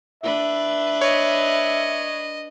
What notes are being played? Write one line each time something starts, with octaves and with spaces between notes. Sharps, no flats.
D4 B4 E5
C#5 D#5